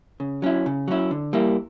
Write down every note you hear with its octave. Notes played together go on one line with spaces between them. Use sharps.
C#3
F#3 C#4 E4
C#3
F#3 C#4 E4
D3
G3 A#3 E4